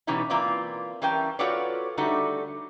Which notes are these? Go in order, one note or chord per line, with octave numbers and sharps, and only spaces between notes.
B2 E3 G3 C#4 D#4 E4
E3 A#3 C4 F4 B4 D5
E3 G3 C#4 A#4 G5 A5
F4 F#4 A4 B4 C#5 D5
D3 G3 A3 D#4 F#4